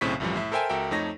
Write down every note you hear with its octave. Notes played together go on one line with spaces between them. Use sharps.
B1 A2 C#3 C4 C#6 B6
C2 F#2 A2 E3 F3 G3
A2 E5
A4 A#4 C5 E5 G5 G#5
C#2 F#4 A4 A#4 E5 G5
F2 A3 D#4 C#5 A#6